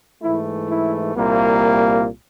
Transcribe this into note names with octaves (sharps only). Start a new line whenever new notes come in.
G#2 E3 A3 E4
E4
C2 A#2 G3 A#3